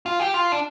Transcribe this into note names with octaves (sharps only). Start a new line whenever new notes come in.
F4
G4
F4
D4